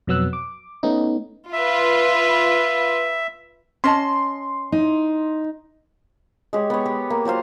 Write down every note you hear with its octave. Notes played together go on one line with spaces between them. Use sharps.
F2 B2 F#3 B3 E6 F#6
D6
A3 B3 C#4 D#4
F4 B4 E5
C#4 D#5 A5 C6
D#4
G#3 G4 C#5
B3 C#5
G4 B4
A#3
F#3 F4 C5 F5